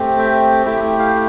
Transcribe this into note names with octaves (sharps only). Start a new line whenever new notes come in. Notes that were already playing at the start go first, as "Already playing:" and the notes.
Already playing: A3 C4 G4
E5 G5
A3 E4 G4 E5 G5
F5
G5